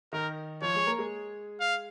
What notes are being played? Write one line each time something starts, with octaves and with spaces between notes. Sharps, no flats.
D#3 D#4 A#4
F3 F4 C#5
G#3 G#4
A#3 A#4
G#3 G#4
F5